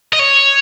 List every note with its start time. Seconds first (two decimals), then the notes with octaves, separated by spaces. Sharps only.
0.13 D#5
0.19 C#5